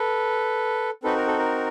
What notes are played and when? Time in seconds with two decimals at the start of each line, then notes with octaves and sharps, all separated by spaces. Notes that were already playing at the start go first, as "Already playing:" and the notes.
Already playing: A4 B4
1.03 C4 D#4 F#4 A4 B4
1.16 A#4
1.27 A4
1.39 A#4